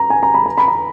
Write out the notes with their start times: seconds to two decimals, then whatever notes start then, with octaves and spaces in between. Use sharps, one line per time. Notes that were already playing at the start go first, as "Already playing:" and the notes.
Already playing: A#5
0.10 G#5
0.23 A#5
0.34 B5
0.46 A#5
0.58 B5
0.68 A#5